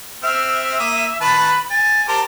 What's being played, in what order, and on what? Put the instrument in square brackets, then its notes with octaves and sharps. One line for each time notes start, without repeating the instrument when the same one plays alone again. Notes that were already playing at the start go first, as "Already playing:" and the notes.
[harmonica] C4 F6 [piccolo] E5
[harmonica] A#3 D#6
[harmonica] D#3 B4 A5 [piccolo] B5
[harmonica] G#5 [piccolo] A6
[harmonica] G4 A#4 C5 [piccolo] A5